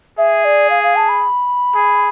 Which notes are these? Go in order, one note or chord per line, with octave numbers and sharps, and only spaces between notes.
G#4 E5
D5
F5
F5
A5
B5
G#4